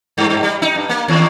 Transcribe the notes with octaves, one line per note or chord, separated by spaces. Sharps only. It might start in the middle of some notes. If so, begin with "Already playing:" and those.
G2
G2
G3
D#4
G2
A#3
D#2